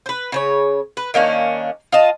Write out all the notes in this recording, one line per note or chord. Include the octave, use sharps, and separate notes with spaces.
B4 C5
C#3 C5 C#5
B4
D#3 A#3 C#4 D4
F4 D#5 A5